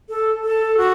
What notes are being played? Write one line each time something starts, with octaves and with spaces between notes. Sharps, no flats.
A4
A4
F#4